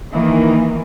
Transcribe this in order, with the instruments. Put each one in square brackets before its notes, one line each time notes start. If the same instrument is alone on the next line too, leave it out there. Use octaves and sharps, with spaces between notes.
[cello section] D#3 E3 A#3